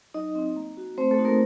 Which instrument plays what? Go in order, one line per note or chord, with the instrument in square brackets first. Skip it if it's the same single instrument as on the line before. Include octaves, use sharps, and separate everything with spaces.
[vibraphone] F#3 D#4 D#5
C4 D#4
A#3
F#4
A3 C4 C5
A3 A4
D#4 F#4
A#3 A#4